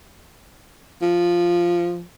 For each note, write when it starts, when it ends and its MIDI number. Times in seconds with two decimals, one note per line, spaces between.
1.02 2.02 53